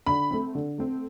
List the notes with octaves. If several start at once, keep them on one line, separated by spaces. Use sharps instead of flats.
D3 B5
A3 C4
D3
A3 C4